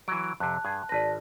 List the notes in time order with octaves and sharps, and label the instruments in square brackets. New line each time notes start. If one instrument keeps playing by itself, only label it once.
[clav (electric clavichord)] E3 F#3 [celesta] D7
[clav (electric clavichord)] F2 C3 [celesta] A5 F#6
[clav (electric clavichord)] G2 G#4
[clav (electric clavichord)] G#1 B4 [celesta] D5 A5 A#6